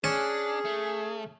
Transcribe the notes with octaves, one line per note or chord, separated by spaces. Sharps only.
C#4 D4 G#4
A3